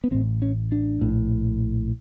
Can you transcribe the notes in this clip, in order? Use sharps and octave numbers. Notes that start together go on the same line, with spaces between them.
B3
A1 A2 C4
C#4
D4
A#1 A2